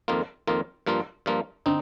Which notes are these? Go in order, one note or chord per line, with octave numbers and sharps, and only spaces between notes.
F2 D#3 A#3 F4
F2 D#3 A#3 F4
G2 F3 A#3 F4
G2 F3 A#3 F4
D3 C4 D#4